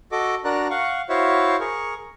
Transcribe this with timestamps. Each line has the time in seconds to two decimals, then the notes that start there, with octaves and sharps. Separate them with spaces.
0.12 F#4 A4 D#5 D6
0.45 D4 F#4 A#4 D5 A#5 F#6
0.70 F5 F#5 C#6
1.09 E4 F#4 C5 C#5 E5 F5
1.60 G#4 A#4 C#6